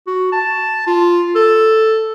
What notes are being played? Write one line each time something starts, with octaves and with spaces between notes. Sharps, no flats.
F#4
A5
F4
A4